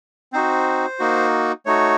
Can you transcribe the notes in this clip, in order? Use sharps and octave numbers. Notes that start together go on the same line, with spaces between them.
C4 D#4 F#4 C5
A#3 D#4 F#4
A3 D#4 F#4 C#5